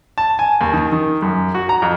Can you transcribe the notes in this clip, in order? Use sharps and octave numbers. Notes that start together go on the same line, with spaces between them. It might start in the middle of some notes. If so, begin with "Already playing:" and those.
A5
G#5
D#2
D#3
D#3
F#2
F#4
A#5
F2